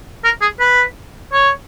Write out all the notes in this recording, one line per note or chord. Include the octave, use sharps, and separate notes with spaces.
A#4
G#4
B4
C#5